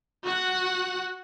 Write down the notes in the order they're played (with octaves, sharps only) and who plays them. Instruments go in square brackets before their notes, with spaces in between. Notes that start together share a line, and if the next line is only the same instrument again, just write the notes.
[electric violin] F#4 F#5